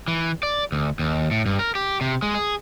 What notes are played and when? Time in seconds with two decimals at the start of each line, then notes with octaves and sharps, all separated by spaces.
0.08 E3
0.43 D5
0.72 D2
0.99 D#2
1.31 A2
1.46 G2
1.59 A#4
1.75 G4
2.01 C3
2.22 G#3
2.35 G#4